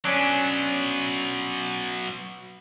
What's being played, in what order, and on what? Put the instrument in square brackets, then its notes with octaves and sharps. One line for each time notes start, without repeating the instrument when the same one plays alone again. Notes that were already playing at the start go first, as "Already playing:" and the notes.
[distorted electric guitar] F#3 B3 [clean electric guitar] C#4 D4